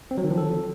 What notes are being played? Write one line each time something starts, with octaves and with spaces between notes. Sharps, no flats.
C4
F#3
D#3
F3
A4